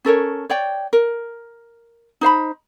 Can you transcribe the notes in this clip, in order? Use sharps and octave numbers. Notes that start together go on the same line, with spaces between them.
C#4 A4 A#4 C#5
C#5 D5 G5
A#4
D#4 C5 F5 B5